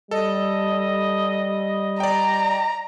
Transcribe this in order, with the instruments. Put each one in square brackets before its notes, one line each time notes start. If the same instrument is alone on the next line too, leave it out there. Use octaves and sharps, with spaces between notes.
[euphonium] G3 [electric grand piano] A4 [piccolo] D#5
[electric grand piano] D5 G5 [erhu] A#5